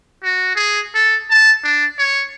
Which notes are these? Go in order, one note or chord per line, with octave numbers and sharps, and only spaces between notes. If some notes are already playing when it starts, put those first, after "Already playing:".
F#4
G#4
A4
A5
D4
C#5